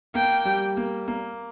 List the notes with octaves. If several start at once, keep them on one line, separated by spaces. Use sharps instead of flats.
A#3 G5
G3
A#3
A#3